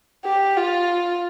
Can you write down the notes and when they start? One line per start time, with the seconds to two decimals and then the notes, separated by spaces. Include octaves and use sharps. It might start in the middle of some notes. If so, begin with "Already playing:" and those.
0.25 G4
0.57 F4